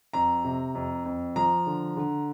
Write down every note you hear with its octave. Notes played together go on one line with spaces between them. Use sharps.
F2 A#5
C3
F2
F2
F3 A#5
D3
D3